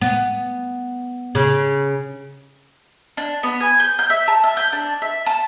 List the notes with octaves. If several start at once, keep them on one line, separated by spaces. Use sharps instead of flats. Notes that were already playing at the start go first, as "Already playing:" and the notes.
B3
C#3
D4
B3
G#5
G6
G6
E5
A5
E5
G6
D4
E5
A5